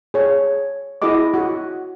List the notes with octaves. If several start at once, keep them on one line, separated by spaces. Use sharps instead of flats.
G#4 C#5
E4 F#4 G#4 D#5 D6
F#4